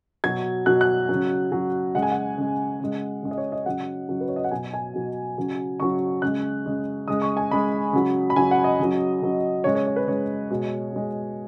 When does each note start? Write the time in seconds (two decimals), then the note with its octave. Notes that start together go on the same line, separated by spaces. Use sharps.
0.24 B2 F#3 G#6
0.66 B2 F#3 F#6
0.81 F#6
1.09 C#3 F#3
1.52 C#3 F#3
1.95 C#3 G#3 F#5
2.03 G#5
2.12 F#5
2.38 C#3 G#3
2.80 C#3 G#3
3.23 C#3 G#3
3.31 D#5
3.38 C#5
3.52 D#5
3.66 C#3 F#3 F#5
4.09 C#3 F#3
4.21 B4
4.29 C#5
4.36 D#5
4.44 F#5
4.51 B2 F#3 G#5
4.73 G#5
4.94 B2 F#3
5.37 C#3 F#3
5.80 C#3 F#3 C#6
6.22 C#3 G#3 F#6
6.66 C#3 G#3
7.08 C#3 G#3 D#6
7.22 C#6
7.37 G#5
7.51 C#3 G#3 B5
7.93 C#3 F#3
8.30 B5
8.36 C#3 F#3 G#5
8.51 F#5
8.64 D#5
8.79 C#3 F#3
9.21 C#3 F#3
9.64 C#3 G#3 C#5
9.75 C#5
9.87 C#5
9.96 B4
10.07 C#3 G#3 C#5
10.50 B2 G#3
10.92 B2 G#3